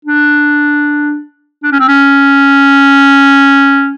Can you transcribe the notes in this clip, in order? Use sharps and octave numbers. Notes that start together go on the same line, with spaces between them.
D4
D4
C#4
C4
C#4